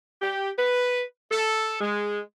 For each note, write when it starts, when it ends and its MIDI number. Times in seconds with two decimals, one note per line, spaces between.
0.21 0.51 67
0.58 1.03 71
1.32 1.79 69
1.81 2.20 56